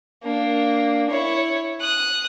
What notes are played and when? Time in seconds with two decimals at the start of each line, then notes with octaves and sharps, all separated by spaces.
0.23 A#3 D4
1.10 E4 C#5
1.81 D#6 F#6